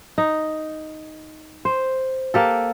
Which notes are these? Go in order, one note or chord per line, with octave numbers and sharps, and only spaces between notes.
D#4
C5
A#3 G4 A4